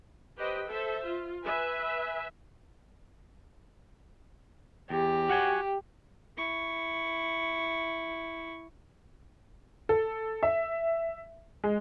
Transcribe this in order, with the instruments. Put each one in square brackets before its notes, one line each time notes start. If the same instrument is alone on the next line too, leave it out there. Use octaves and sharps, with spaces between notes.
[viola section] G4 B4 C5 D#5 G5
A4 C5 E5
F4
B4 E5 G#5
[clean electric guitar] E2 [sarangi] G4
[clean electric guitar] F#4 F#5 G#5
[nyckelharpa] E4 C#6
[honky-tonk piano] A4
E5
G#3